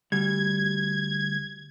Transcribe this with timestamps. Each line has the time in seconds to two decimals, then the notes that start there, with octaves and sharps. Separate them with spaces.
0.12 D2 G3 G#6